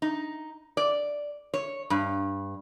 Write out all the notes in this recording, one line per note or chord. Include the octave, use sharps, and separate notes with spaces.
D#4
D5
C#5
G2